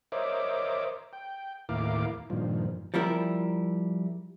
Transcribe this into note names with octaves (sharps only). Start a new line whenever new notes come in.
A#4 C5 C#5 D#5 E5 D6
G5
D#2 A2 E4 A#4 F5 D6
G2 A#2 D#3 F3
F3 G3 E4 A#4